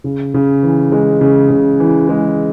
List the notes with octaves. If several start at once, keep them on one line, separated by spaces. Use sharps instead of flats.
C#3
C#3
E3
G#3
C#3
C#3
E3
G#3